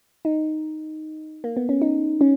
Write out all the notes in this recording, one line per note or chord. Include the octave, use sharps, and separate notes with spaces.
D#4
A#3
B3
C#4
D#4
C#4